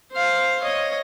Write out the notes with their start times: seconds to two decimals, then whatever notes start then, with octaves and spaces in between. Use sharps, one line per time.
0.12 C5 F5
0.62 C#5 D#5